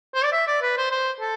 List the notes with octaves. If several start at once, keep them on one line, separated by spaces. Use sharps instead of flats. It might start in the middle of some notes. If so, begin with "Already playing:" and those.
C5
D5
E5
D5
B4
C5
C5
A4